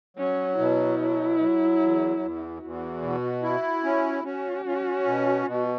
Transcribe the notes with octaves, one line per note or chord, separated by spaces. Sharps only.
F#3 C#4
B2 E4
F#3
F#3
E2
E2
E2 F#4
B2
E4
C#4
C#4 F#4
C#4
B2
B2